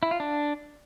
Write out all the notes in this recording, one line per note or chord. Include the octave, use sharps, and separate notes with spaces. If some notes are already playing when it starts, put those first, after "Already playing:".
E4
F4
D4